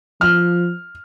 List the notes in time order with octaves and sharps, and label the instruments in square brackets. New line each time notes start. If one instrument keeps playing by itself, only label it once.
[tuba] F3 [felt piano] F6